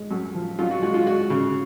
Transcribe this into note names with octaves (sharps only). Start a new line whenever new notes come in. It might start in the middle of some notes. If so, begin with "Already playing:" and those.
Already playing: G#3
F#2
F3
F#2 F4
F#4
G#3 F#4
F4
G#3 F#4
C#3